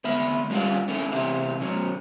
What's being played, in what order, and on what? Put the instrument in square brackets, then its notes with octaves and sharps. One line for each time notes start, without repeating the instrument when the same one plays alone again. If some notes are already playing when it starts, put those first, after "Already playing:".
[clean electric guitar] D2 B3 E5 B5
G3 C#4 F4 G4 F5 F#5
B3 C#4 D4 E4 A4
C3 E3 B3 G4 E5
B2 F#3 C#4